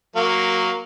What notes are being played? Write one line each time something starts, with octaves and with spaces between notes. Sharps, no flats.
F#3 A#3 F5